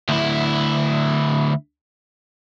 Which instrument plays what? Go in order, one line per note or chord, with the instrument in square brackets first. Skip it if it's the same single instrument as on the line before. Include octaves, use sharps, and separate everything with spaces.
[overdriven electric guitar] D2 E4